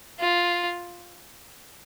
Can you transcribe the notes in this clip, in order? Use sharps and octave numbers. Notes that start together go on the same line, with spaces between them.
F4